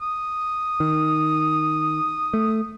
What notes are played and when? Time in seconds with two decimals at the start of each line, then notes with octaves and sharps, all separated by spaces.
0.01 D#6
0.80 D#3
2.34 A3